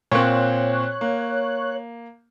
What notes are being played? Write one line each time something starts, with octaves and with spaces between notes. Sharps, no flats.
A#2 C4 C#5 F#6
A#3